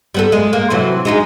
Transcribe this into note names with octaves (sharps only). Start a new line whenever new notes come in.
G3 B3 A4
G#3
A#3
C3 E3 F#3
G#3 D#4 G#4